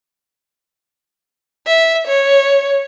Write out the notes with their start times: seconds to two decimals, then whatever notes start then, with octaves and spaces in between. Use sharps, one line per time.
1.67 E5
2.07 C#5